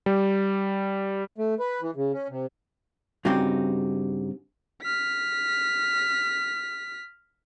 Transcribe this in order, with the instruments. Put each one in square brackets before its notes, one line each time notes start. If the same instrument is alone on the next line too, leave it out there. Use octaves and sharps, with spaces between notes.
[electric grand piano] G3
[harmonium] A3
B4
E3
C#3
C#4
C3
[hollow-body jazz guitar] G2 C#3 C4 D#4 F#4 G4
[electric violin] F6 B6